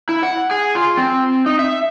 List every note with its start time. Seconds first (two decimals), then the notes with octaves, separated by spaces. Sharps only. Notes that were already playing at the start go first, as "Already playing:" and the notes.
0.09 E4
0.23 F#5
0.51 G#4
0.75 F4
0.97 C4
1.46 D#4
1.59 E5